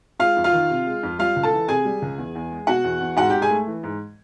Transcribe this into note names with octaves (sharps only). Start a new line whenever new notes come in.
G#3 F4 F5
F2
F4 F5
D#3
C3
G#3
F2
G3 F4 F5
C#2
A4 A5
E3
C3 G#4 G#5
G3
C#2
E2
E2
G#3
B2 F#4 F#5
E2
E2
G#2 F#4 F#5
G#2 G4 G5
G#4 G#5
A3
E3
G#2